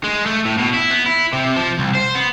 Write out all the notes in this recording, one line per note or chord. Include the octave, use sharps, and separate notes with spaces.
G#3
A3
A2
B2
E4
B3
E4
C3
F3
C2
C5
B3